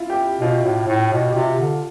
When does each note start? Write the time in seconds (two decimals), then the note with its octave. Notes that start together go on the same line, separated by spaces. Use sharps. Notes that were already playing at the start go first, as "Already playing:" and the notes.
Already playing: E4 F4
0.10 G4
0.41 B2 F4
0.64 A2
0.88 A2
1.13 B2
1.28 G4
1.35 C3 F4
1.60 D3